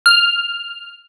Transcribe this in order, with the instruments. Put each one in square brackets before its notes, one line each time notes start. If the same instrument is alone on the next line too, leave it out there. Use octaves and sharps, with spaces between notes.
[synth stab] F6